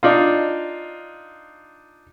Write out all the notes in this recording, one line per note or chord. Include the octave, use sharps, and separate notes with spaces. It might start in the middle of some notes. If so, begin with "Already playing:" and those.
D4 D#4 F4